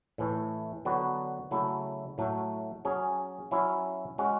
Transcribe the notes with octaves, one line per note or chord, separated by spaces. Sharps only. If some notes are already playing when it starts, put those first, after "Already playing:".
A2 E3 A3
D3 F#3 B3 F#4
C#3 F#3 A3 E4
A2 F#3 A3
F#3 C#4 G#4
F#3 C#4 E4
G#3 C#4 F#4